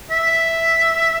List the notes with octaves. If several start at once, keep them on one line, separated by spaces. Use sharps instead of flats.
E5